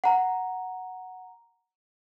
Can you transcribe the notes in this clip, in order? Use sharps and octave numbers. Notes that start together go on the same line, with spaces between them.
F#5 A#5